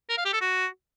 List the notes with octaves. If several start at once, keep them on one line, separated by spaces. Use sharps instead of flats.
A#4
F5
G4
A4
F#4